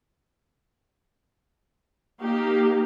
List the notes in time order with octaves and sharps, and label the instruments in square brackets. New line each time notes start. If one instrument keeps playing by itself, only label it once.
[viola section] A#3 D#4 G4